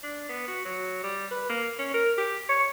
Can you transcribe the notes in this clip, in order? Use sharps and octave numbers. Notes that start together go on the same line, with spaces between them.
D4
B3
F#4
F#3
G3
B4
A#3
C#4
A#4
G4
C#5